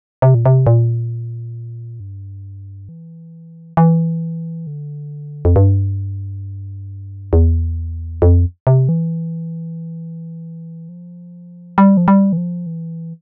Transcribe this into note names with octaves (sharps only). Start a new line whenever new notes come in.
C3
A#2
C3
A#2
G2
E3
E3
D3
F2
G2
E2
F2
C3
E3
F3
G3
F3
G3
E3
F3
E3